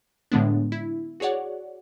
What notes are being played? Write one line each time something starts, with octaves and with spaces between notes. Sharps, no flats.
A2 D3 G#3 B3 D4
E4
F#4 G#4 C#5 D5 F#5